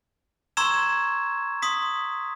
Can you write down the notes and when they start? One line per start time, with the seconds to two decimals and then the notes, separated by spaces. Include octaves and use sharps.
0.57 A#5 C6 C#6 E6 G#6 E7
1.62 C6 D#6 B6